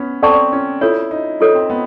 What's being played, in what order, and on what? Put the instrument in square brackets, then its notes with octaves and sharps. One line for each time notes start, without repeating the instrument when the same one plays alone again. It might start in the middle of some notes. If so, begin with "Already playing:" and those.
Already playing: [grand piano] B3 C#4
[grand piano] C4 [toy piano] A4 D5 F#5 A5 C#6
[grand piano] C#4
[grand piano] E4 [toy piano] F4 A4 C#5
[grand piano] D#4
[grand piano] D#4 [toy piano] F4 A4 C#5
[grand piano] C4
B3